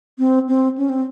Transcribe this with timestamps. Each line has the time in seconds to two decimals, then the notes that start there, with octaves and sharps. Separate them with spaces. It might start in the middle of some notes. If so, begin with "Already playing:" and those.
0.19 C4
0.48 C4
0.78 C#4
0.89 C4